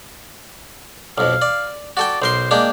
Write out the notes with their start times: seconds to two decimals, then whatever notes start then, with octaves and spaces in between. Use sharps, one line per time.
1.18 B1 F2 F5
1.42 D5
1.97 F#4 A4 D5 G5
2.22 B1 A#4 C5 C6
2.51 G#3 A#3 D4 G5